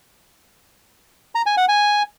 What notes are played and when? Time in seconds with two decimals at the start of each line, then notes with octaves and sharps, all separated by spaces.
1.35 A#5
1.46 G#5
1.57 F#5
1.68 G#5